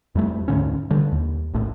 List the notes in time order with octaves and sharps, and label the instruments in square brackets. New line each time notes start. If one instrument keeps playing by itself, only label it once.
[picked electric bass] F2 G3 A3
D2 G#2 D3 C#4
D3 G3
D#2
D#1 A#1 A2